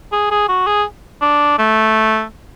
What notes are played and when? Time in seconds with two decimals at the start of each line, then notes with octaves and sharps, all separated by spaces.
0.12 G#4
0.31 G#4
0.48 F#4
0.67 G#4
1.22 D4
1.58 A3